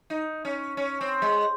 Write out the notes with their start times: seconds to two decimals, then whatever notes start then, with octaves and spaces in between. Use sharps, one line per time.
0.10 D#4
0.45 C#4
0.77 C#4
1.01 C4
1.22 G#3